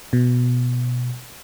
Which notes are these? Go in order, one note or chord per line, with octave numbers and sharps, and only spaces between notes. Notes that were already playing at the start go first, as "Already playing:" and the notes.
B2